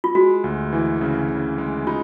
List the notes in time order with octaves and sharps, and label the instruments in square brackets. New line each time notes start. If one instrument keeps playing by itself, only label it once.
[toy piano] F4
[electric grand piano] G#3 [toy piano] F#4
[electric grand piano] D2
E3
C#3
C#3
G#3
[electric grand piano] D#4 [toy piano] F4